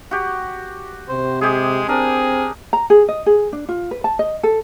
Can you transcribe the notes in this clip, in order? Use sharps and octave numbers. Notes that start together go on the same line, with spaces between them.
F#4 G4
C3 C5
G#3 G4 G#4
C4 D4 G#4 A#4
A#5
G#4
D#5
G#4
D4
F4
B4
A5
D#5
A4